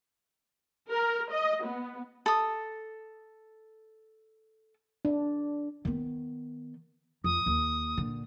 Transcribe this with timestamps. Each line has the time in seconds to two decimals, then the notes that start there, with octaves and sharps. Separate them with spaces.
0.89 A#4
1.32 D#5
1.65 B3
2.26 A4 D#6
5.05 D4
5.85 D#3 B3
7.24 F2 D#6
7.46 D#2
7.97 A#2 D3